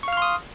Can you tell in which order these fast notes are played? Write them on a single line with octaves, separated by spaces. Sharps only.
C#6 F5 F6 C6 D#6